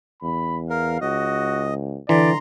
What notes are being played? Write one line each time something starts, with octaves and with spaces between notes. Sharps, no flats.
E2 B5
A#4 F5
C#2 F#4 D#5
D3 E3 D5 A#5 C6